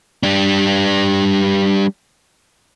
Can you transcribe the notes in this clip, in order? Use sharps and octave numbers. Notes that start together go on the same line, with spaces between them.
G3 D4